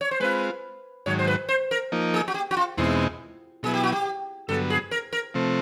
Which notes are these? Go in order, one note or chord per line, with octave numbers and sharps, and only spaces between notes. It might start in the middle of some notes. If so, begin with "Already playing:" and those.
C#5
C5
G#3 C4 F4 B4
G#2 D#3 F#3 C#5
C5
B4
C5
A#4
F3 A#3 D#4
G#4
F#4
G4
F#4
F4
E2 B2 G#3 C4 D#4 E4
B2 F#3 B3 E4 G#4
G4
F#4
G4
G2 D3 F#3 B3 A4
G#4
A#4
A#4
C3 F3 A3 C4